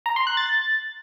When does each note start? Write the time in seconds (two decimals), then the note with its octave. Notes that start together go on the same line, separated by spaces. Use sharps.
0.06 A#5
0.16 C6
0.27 F#6
0.37 A6